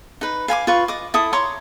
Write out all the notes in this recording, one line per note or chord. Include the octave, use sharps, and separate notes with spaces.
D#4 B4
F5 G#5 B5 D6
F4 B4 C#6
D#5 D6
E4 A4 D#6
C#5 A#5 C6 D6